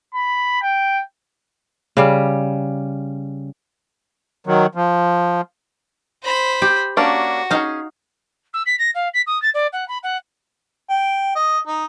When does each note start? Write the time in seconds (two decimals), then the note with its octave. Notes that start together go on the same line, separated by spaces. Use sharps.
0.14 B5
0.61 G5
1.97 C#3 G3
4.47 D#3 F#3
4.75 F3
6.23 C5 B5
6.62 G4
6.97 A#3 C#4 D4 F#4
7.51 C#4 D#4 G#4 F5
8.53 E6
8.66 B6
8.78 A#6
8.94 F5
9.14 B6
9.27 D#6
9.42 A6
9.54 D5
9.72 F#5
9.88 B5
10.03 F#5
10.90 G5
11.36 D#5
11.67 D#4